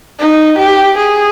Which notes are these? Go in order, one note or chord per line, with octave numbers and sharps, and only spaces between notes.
D#4
G4
G#4